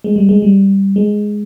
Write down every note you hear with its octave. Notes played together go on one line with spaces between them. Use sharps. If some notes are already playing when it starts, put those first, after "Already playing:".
G#3
G3
G#3
G3
G#3